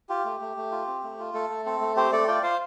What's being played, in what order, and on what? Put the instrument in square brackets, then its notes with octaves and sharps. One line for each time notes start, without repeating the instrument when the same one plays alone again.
[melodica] F4 G4
A3
A3
A3
F4
C4
A3
F4
A3 A4
A3
C4 A4
A3
C4 G4 C5
A3 A4 D5
F4 D5 G5
F4 C5 F5